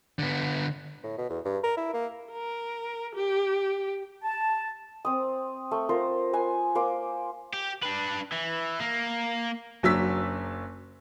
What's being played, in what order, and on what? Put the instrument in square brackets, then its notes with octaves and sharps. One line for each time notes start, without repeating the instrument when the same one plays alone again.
[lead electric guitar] D3 B3
[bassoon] A2
B2
E2
G2
A#4
E4
A#3
[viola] A#4
G4
[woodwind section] A5
[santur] C4 D#6
A3
F4 A#4 C5
B4 C5 G#5
A#3 C5 D6
[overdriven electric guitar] G4
D4 B4
E3
A#3
[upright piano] F#1 F#3 D4 E6 B6